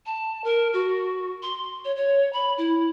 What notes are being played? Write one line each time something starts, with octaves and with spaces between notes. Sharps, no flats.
A5
A#4
F#4
C6
C#5
C#5
B5
E4